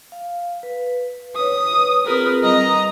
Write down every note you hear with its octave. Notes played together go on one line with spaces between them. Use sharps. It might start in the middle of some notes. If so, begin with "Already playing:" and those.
F5
B4
B4 C#5 D#6
C4 F4 G#4 A#4 B4
G3 D#5 A#5